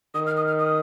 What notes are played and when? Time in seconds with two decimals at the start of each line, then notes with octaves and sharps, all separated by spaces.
0.14 D#3 D#6
0.26 F6
0.37 D#6
0.47 F6
0.59 D#6